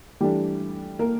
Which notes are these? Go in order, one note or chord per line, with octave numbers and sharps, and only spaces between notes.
E3 G3 A3 D4 G4
A#3 A#4